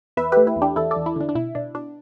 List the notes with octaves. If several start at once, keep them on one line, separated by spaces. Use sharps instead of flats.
E2 B4 E5
A3 G4 B4
E4
E2
D4 G4
E2 E4 A4
A4 D5
E2
E4
D3 D4
D4
B2 E4
B2 D4
B2 D4